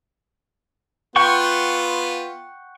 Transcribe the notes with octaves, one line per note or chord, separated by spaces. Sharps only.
B3 F4 F#5 G5 C#6